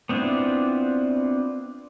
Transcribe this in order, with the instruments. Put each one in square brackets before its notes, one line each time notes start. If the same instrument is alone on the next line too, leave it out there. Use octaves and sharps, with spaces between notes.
[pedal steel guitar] B3 C4 D4 E4 F4